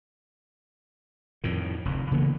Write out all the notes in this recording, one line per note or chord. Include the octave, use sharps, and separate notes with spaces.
F2 A2 D#3
F1 D2
C#3 E3 A#3 B3